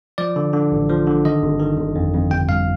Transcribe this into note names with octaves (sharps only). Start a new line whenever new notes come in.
F3 D5
D3
D3
A1
F3
D3
D#3 D#5
G1
D#3
G1
F2
F2
G1 G5
G2 F5